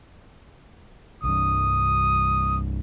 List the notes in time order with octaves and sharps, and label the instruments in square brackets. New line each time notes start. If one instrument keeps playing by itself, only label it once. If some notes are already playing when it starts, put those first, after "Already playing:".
[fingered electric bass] C2 G2 [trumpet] D#6